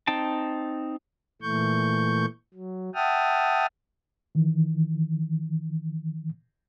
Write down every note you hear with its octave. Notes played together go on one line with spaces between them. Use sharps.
C4 D#4 G5 A5
A#2 E3 A3 C#6 G6
F#3
E5 F#5 G5 A5 D#6 F6
D#3 E3